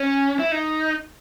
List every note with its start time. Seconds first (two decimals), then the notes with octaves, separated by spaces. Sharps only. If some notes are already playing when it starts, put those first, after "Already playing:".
Already playing: C#4
0.39 E4
0.51 D#4